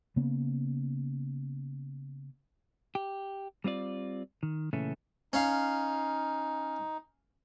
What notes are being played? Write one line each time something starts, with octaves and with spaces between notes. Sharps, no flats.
C#3 A#3 B3 C#4
G4
G3 C4 F4 D5
D#3
A#2 C#3 E3 A3 C#4
C#4 D#4 F5